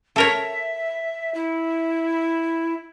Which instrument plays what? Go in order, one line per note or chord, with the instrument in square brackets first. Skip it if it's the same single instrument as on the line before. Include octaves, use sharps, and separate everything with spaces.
[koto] A4 A#4 C#5 [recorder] E5
[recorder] E4